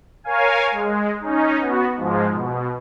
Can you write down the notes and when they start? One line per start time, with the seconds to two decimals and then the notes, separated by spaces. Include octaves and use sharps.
0.24 A#4 C#5 F5 G#5
0.72 G#3
1.20 C#4 D#4
1.59 B3 F#4
1.96 G#2 F3 G#3
2.31 B2